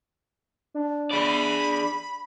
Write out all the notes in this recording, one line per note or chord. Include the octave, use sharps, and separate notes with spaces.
D4
G#4 D5 B5